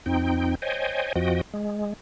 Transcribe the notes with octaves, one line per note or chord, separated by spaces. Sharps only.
F2 C4 D#4 G5
C5 C#5 D#5 G5 G#5
F2 F3 F#4 D#5 G5
G#3